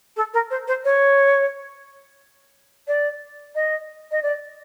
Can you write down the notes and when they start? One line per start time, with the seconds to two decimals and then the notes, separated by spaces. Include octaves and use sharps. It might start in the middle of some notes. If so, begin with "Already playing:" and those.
0.17 A4
0.34 A#4
0.51 C5
0.68 C5
0.85 C#5
2.88 D5
3.55 D#5
4.11 D#5
4.23 D5